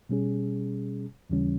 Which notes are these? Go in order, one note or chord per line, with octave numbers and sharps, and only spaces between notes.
B2 G3 C#4 G#4
D#2 C#3 E3 G3 C#4